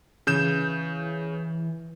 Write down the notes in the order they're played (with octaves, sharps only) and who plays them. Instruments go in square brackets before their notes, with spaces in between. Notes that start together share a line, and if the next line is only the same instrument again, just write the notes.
[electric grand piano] C#3 G6 E7 [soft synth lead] E3